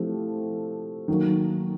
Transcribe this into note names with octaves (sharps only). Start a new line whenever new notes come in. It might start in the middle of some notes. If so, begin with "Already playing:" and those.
Already playing: F3 A3 C4 E4 G4
D#3 F#3 A#3